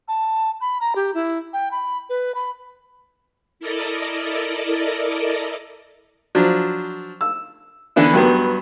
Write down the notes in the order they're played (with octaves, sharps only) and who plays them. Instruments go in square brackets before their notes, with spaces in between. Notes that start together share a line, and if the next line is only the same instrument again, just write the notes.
[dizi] A5
B5
A#5
G4
E4
G5
B5
B4
B5
[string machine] E4 A4 A#4 D5 D#5
[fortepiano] F3 F#3 D4
E6
D3 E3 B3 D4 E4
G2 F#3 G3 B3